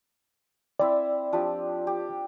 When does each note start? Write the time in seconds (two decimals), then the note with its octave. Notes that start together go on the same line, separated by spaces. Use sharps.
0.80 C4 E4 D5 E5
1.33 F3 D4 G4
1.87 G4